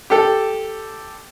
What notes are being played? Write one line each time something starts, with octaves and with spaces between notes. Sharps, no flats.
G4 A4